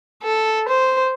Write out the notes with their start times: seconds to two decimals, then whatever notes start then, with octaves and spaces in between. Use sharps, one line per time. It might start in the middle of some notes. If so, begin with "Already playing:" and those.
0.23 A4
0.69 C5